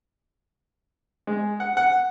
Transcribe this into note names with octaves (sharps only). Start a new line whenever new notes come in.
G#3
F#5
F#5